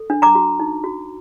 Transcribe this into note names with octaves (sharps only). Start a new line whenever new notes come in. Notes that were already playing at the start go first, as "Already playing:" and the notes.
Already playing: A4
D4
A#5 D6
F#4
D#4
F#4